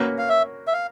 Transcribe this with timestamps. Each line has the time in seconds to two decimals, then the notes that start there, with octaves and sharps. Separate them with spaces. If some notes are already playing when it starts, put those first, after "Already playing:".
Already playing: A#3 C#4 F#4 B4
0.18 F5
0.29 E5
0.67 E5
0.73 F5